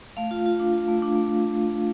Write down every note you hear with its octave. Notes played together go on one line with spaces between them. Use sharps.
A3 F5
F4
F4
D4
F4
A3
D4
A3